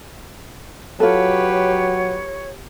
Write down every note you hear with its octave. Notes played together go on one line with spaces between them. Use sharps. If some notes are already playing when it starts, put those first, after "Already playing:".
F#3 F4 G4 A4 B4 C#5